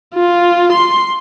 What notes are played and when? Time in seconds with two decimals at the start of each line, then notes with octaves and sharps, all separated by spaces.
0.14 F4
0.72 C6